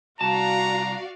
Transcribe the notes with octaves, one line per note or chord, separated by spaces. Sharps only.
C2 F#4 D5 F5 A5 A#5